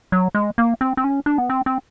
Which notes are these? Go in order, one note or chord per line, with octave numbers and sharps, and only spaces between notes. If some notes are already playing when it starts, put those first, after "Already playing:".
F#3
G#3
A#3
C4
C4
C#4
D4
B3
C4
C4